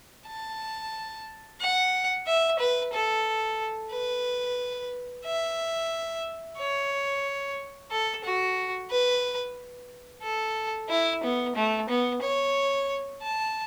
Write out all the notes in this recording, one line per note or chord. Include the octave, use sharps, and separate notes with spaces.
A5
F#5
E5
B4
A4
B4
E5
C#5
A4
F#4
B4
A4
E4
B3
A3
B3
C#5
A5